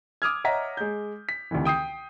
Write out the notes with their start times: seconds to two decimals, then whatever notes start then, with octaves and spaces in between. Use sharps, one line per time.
0.22 D6 D#6 F6 G#6
0.44 C#5 D#5 E5 F#5 A#5 B6
0.77 G#3 G6
1.29 B6
1.51 D2 C3 D#3 E3
1.65 G5 D#6 G6 C7